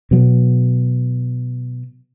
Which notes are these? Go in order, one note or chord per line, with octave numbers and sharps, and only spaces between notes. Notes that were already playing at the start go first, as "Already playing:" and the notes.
B2 F#3